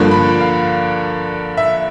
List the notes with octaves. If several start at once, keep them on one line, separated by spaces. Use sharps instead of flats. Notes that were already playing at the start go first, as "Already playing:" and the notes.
Already playing: G2 D3 F3 A#3
B5
F5
E5